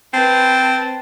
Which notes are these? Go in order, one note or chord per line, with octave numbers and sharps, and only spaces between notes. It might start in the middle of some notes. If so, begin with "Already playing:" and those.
C4 B4 A5